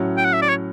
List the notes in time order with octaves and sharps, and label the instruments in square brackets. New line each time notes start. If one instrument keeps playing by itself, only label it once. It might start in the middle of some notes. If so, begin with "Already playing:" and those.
Already playing: [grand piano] A2 F#3 C#4
[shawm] G5
F#5
E5
D5
C#5